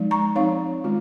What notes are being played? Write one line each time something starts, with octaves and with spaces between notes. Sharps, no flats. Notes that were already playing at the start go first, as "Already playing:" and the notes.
Already playing: F3 G#3 D#4
A#5 C#6
F3 C4 D#4 C#5 F5
D#3 G#3 C#4 F4